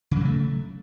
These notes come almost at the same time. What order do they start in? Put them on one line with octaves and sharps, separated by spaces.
C#3 F#3 A#3 A3